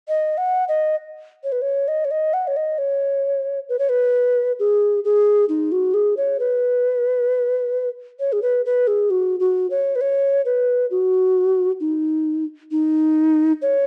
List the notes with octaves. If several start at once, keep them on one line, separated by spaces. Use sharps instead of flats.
D#5
F#5
D#5
C#5
B4
C#5
D#5
C#5
D#5
F#5
C#5
D#5
C#5
B4
C#5
B4
G#4
G#4
D#4
F#4
G#4
C#5
B4
C#5
G#4
B4
B4
G#4
F#4
F#4
C#5
B4
C#5
B4
F#4
D#4
D#4
C#5